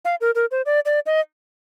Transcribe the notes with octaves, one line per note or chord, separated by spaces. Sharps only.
F5
A#4
A#4
C5
D5
D5
D#5